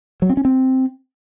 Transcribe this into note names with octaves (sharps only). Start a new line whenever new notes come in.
F#3
C4
C#4
C4